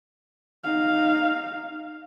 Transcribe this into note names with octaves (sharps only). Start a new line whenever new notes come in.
D#4 F5